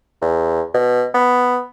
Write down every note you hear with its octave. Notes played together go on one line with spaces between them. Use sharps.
E2
B2
B3